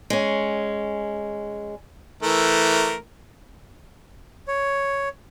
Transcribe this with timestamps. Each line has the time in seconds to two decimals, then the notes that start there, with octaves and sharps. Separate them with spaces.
0.10 G#3 C#4
2.23 E3 A3 A#4
4.48 C#5